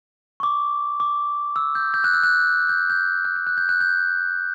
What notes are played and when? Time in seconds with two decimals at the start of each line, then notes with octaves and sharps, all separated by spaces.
0.40 C#6
0.43 D6
1.00 D6
1.56 E6
1.75 G6
1.94 G6
2.04 F#6
2.14 E6
2.23 F#6
2.69 G6
2.90 G6
3.25 F#6
3.36 G6
3.47 F#6
3.58 G6
3.69 F#6
3.81 G6